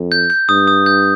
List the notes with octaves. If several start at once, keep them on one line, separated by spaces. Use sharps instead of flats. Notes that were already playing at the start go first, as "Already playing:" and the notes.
Already playing: F2
G6
G6
G2 D#6
D#6
G6